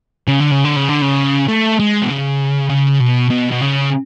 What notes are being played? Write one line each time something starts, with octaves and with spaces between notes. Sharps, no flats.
C#3
D3
C#3
D3
C#3
D3
C#3
A3
G#3
B2
C#3
C#3
B2
B2
B2
C#3